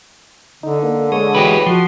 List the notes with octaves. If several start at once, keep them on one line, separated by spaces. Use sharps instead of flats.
D3 D#4
A#3
G#3 C#5 D#6
E3 F#4 G4 B4
F3 F#4 C6